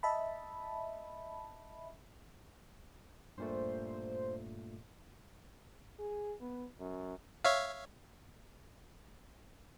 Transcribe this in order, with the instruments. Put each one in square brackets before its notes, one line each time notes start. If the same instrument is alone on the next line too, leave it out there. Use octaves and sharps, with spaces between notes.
[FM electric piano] D#5 E5 A5 B5
[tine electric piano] G2 A#2 A3 [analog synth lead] C5
[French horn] G#4
B3
F#2
[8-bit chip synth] C#5 E5 F5